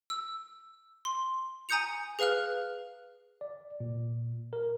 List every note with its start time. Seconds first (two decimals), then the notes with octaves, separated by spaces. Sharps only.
0.10 E6
1.05 C6
1.69 G#5 A#5 D#6 G6 C#7 F7
2.19 G#4 B4 F5 F6 F#6
3.41 D5
3.80 A#2
4.53 A#4